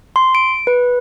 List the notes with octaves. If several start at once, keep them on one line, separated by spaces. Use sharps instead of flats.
C6
D7
B4